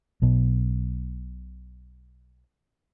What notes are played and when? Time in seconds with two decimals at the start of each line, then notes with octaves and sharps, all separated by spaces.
0.22 B1 B2